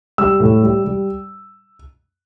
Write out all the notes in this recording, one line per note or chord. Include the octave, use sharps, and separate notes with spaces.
G3 E6
A2
G3
G3